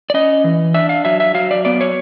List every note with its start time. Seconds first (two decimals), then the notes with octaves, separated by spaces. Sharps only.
0.10 D5
0.14 C#4 D#5
0.44 E3
0.74 D4 E5
0.89 F5
1.05 F#3 E5
1.20 E5
1.34 F#3 F5
1.51 D5
1.65 B3 D5
1.81 C#5